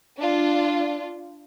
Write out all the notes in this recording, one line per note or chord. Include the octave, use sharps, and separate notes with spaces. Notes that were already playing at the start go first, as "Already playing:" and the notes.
D4 F4